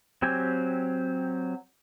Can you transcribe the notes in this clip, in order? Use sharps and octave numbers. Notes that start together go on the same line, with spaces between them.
F#3 C4 G4 G#5